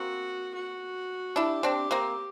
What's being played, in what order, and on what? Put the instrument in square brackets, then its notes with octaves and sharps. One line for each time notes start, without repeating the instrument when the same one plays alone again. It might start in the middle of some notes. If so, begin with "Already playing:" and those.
Already playing: [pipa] A#3 C4 [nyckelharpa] F#4
[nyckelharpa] F#4
[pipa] D4 E4 [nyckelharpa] G4
[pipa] C4 D4
A#3 C4